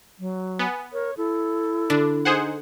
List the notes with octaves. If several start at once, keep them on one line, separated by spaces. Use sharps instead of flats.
F#3
B3 G#5
A#4 C#5
E4 A4
D3 D4
D#4 G#4 C5 F#5